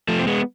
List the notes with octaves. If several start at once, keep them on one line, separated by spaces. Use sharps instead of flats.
F3 A3
C4
G#3 B3